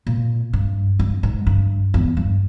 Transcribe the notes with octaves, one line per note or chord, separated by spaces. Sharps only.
A#2
G2
G2
G#2
G2
E2
G2